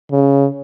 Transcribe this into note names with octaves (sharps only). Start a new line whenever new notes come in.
C#3